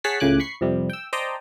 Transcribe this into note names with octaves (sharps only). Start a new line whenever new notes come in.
G#4 C#5 F#5 A5 B6 C7
C#2 A2 C#3 G#5 D6 F#6
B5 C#6 C7
F2 C3 G3
G5 E6
C5 D5 D#5 G5 A5 A#5